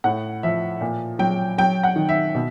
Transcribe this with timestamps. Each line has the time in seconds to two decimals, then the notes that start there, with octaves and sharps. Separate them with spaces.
0.04 A2 F#5
0.43 F3 E5
0.81 A#2
1.19 F#3 G5
1.58 F#3 G5
1.83 F#5
1.96 D#3
2.09 E5
2.35 B2